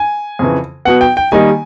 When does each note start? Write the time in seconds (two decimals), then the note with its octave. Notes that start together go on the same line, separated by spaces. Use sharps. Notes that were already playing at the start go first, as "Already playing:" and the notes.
Already playing: G#5
0.39 F2 C#3 E3
0.85 B2 F#3 B3 F#5
1.01 G5
1.17 G5
1.32 D#3 G3 A#3 D#4 G#5